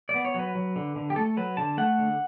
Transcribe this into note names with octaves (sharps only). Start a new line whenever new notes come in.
B3 D5
C#5
F#3 B4
F#3
D3
D3
G4
A3 A4
F#3 B4
D3 A5
A3 F#5
D3